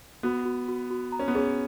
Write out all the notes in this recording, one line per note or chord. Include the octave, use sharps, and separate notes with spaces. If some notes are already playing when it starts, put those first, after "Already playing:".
B3 F#4
F#4
F#4
F#4
A#5
C#4
B3
C#4 G#4